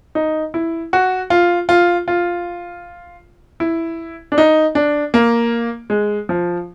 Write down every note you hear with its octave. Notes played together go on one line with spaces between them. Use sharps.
D#4
E4
F#4
F4
F4
F4
E4
D4
D#4
D4
A#3
G#3
F3